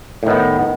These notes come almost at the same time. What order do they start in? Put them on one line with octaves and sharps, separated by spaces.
A2 D#3 B3